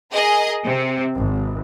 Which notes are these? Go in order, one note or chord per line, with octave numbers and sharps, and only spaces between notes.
G#4 A#4 D#5
C3 C4
G#1